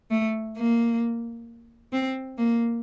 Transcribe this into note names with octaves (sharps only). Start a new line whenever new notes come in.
A3
A#3
C4
A#3